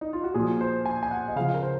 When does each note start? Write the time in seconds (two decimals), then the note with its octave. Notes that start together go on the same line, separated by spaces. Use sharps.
0.01 D#4
0.13 F4
0.24 F#4
0.34 A#2 F3 G#4
0.61 C5
0.85 G#5
1.03 G#5
1.11 F#5
1.28 D#5
1.36 C#3 F3 F5
1.54 A#4
1.62 C5